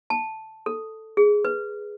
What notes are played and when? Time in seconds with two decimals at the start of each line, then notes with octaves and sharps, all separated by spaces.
0.10 A5
0.66 A4
1.17 G#4
1.45 B4